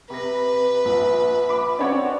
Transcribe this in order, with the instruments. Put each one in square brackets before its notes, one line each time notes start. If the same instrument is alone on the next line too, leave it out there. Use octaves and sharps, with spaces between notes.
[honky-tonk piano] C3 A#6 [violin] B4
[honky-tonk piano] A#1
[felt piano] B5 D6
[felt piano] C4 D4 [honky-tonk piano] F#4 C#5 D5